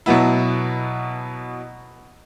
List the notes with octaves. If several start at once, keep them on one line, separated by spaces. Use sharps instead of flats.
B2 F#3 B3 E4